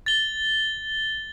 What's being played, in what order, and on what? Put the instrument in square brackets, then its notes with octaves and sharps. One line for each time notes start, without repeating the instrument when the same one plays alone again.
[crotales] A6 G7